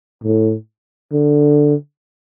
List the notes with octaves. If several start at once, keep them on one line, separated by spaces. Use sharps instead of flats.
A2
D3